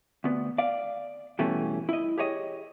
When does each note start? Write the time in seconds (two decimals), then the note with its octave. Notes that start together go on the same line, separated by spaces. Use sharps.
0.24 D2 B3
0.58 D5 F5
1.39 G2 B2 E3 A3 C#4
1.89 E4 D#5
2.18 G4 G#4 C#5 D#5